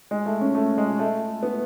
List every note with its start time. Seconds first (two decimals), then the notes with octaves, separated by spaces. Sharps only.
0.11 G#3
0.26 A3
0.41 C#4
0.55 A3
0.78 G#3
0.99 A3
1.43 B3